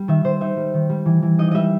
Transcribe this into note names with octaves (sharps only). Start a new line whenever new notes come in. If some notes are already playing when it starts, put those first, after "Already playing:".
Already playing: G3
D#3 E5
D#3 C5
D#4 E5
G3
D#3
G3
E3
E3
D#4 D#5
G3 D#5 E5